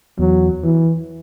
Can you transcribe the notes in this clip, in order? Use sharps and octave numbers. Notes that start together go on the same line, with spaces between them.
E2 F#3
E3